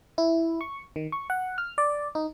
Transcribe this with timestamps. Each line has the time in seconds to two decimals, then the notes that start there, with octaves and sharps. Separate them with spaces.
0.18 E4
0.61 C#6
0.96 D#3
1.12 C#6
1.30 F#5
1.58 F6
1.78 D5
2.15 D#4